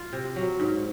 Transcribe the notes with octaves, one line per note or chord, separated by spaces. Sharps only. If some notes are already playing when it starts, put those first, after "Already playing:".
Already playing: F4
C3
F#3
G#2